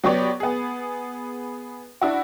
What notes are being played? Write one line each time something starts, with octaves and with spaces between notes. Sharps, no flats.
F#3 B3 G4 C#5 D5
B3 G#4
D4 E4 F#4